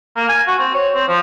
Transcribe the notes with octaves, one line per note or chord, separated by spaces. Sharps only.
A#3
G#5
F#4
C4
C#5
C4
F3